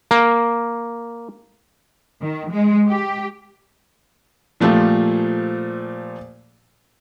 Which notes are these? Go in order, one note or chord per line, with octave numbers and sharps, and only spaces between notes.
A#3
D#3
G#3
G4
A#2 F3 A3 F4 G4 A4